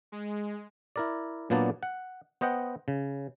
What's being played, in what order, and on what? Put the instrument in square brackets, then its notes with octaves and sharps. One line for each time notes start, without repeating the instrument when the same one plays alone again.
[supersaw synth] G#3
[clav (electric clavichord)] E4 A#4 D5
A#2 F#3 A#3 B3 D4 A5
F#5
B3 C5 D#5 F#5 G5
C#3